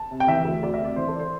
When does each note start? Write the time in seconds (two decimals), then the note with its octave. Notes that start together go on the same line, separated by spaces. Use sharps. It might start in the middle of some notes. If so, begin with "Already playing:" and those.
Already playing: A5
0.11 C3
0.20 G5
0.28 E3 E5
0.44 D2
0.63 D2 D5
0.74 E5
0.80 C3 D5
0.96 E3 C5
1.08 A4
1.15 D5
1.19 C5